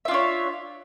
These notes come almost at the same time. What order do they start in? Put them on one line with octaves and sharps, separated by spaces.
E5 F4 D4 C#5